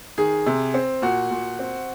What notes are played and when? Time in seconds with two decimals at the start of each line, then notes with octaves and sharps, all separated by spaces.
0.18 D#3 G#4
0.46 C3
0.74 C4
1.02 A#2 F#4
1.31 A#2
1.59 C4